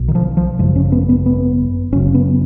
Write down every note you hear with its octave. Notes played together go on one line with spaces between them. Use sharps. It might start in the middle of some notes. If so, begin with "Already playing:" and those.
Already playing: B1 B2
D#3
F3
F3
G#1 F#2 C#3 F3
C#4
B3
B3
B3
F#1 F#2 C#3 C#4
B3